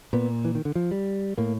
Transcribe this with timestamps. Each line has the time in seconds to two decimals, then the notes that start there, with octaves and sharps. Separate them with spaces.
0.13 A#2 B3
0.45 E3
0.55 D#3
0.65 D3
0.75 F3
0.91 G3
1.38 A2 A#3